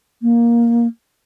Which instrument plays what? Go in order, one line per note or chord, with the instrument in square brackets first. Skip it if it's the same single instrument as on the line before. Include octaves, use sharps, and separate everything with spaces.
[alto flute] A#3